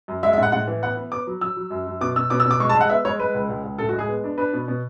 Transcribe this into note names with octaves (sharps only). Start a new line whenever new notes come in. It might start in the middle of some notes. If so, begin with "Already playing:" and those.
F#2
G#3 E5
E5
A2 F#5
A2 F#5
E3
B3 F#5
B3
B3 D6
F#3
F#3 E6
F#3
F#2
F#2
B2 D6
B2 E6
B2 D6
E6
B2
D6
G#3 C#6
A5
G#3
F#5
B3 E5
G#3 C#5
G#3 B4
C#2
C#2
C#2
A2 A4
F#4
G#3
G#4
B3
D4
D4 B4
B2
B2